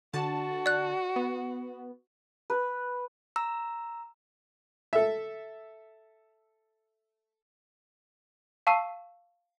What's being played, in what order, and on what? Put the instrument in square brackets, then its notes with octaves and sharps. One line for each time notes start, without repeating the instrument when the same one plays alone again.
[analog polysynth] D3 A5 [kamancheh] F#4
[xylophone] D5 F#6
[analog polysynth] B3
[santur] B4
[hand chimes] A#5 E6
[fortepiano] A4 E5
[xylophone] F5 A5 C#6 E6 C7 D#7